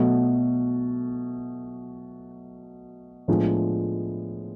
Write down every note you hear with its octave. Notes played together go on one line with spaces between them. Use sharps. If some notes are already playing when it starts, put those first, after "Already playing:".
Already playing: B2 F#3 A3
A2 F3 G#3 B3 D4